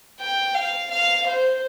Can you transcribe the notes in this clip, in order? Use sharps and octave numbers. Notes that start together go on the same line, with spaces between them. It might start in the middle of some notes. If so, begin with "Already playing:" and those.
G5
F5
F5
C5